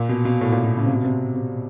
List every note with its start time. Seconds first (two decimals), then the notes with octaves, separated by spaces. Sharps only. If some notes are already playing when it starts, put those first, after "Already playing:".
Already playing: A#2
0.09 B2
0.25 B2
0.41 A2
0.52 A#2
0.64 B2
0.77 C#3
0.86 C3
0.95 B2
1.05 C3
1.36 C3